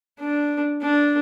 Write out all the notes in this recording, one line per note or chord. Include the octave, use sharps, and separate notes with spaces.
D4
D4